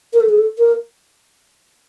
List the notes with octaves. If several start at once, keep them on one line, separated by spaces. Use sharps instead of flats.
A#4
A4
G#4
A4
A#4